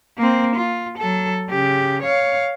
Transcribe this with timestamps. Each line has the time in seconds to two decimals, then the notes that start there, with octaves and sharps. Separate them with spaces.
0.18 A#3 C4
0.56 F4
0.98 F#3 A4
1.49 C#3 G4
2.03 C#5 F5